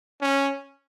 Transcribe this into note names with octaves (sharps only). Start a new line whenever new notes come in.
C#4